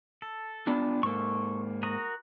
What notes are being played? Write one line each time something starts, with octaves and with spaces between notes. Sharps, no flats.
A4
B3 D4 F4
G#2 A#3 A4 C#6
F#4 A#4 D#6